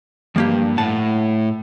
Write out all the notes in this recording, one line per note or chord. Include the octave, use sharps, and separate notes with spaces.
G2 F3 A#3 G4
A2 F#5 A5